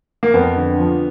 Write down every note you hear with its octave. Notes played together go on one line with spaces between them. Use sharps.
A#3
F2 B3
D3
F3